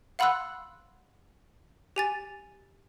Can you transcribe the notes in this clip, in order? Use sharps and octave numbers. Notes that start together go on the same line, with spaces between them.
F5 F#5 B5 C6 E6 F#6
G4 G#5 A6